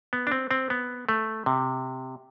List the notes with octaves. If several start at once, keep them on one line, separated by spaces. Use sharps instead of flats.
B3
D4
C4
C4
B3
A3
C3